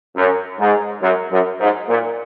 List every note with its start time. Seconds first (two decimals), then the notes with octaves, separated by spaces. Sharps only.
0.16 F#2
0.59 G#2
1.03 F#2
1.32 F#2
1.60 G#2
1.89 A#2